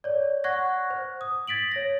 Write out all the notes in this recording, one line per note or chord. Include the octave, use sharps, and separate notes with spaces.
C#5 D5
F#5 C#6 F#6 G#6 A#6
C5
D#6
G#6 A6 B6 D7 F#7
C#5 A#6